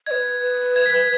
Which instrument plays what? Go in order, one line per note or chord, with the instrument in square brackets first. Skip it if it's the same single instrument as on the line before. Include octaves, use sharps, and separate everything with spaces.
[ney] D#5 [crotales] G#6
[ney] B4
[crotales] G#6
B6